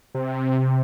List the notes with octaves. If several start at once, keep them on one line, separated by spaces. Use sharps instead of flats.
C3